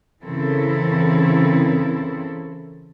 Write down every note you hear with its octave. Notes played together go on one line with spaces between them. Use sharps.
C#3 E3 C4 E4 A4 A#4